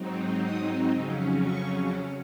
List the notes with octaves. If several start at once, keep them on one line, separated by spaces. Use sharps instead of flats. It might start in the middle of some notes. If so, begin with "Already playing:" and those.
Already playing: G#2 F#3 C4 D#4
D#6
F2 C#3 F#3 C#4
C#6